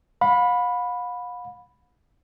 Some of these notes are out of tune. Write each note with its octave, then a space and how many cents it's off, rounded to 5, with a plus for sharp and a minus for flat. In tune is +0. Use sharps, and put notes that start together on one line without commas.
F5 +45 B5 +0